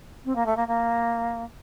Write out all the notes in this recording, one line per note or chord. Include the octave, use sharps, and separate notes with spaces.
C4
A#3
A3
A#3
A#3